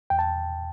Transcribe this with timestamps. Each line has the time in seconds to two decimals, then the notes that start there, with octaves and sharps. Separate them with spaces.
0.10 E2 G5
0.19 A5